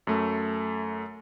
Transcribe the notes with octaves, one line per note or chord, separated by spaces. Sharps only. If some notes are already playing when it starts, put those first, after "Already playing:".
F#2 A3